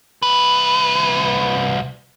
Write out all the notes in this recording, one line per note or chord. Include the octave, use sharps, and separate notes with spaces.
C2 B4